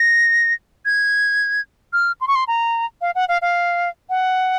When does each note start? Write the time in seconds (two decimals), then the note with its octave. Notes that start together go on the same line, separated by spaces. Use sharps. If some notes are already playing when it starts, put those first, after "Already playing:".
Already playing: A#6
0.85 G#6
1.93 F6
2.21 C6
2.28 C#6
2.35 C6
2.48 A#5
3.01 F5
3.15 F#5
3.28 F5
3.42 F5
4.09 F#5